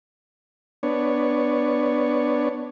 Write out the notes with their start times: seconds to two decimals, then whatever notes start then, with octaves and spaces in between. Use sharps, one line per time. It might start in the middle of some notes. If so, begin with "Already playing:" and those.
0.83 B3 D4 C#5